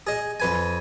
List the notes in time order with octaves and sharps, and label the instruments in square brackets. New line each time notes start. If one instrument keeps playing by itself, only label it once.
[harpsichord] G#4 D#5
F2 B4 G#5